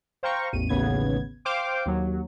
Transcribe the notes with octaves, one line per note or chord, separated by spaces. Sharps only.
C5 F5 G5 A#5 C#6
A1 E2 D#7
A1 D#2 C#3 B3 G#6
C5 F5 G5 C6 D6
D#2 F#3